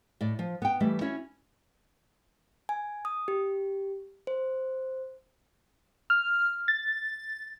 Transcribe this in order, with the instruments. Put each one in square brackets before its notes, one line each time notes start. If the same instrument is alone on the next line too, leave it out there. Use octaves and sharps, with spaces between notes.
[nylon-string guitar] A2 D5
F3
B3 G5
E3 G3 A3
C#4 E4 F#4 C#5
[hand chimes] G#5
D#6
G4
C5
[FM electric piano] F6
A6